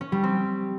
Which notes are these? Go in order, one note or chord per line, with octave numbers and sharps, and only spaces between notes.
C#4
G3
C4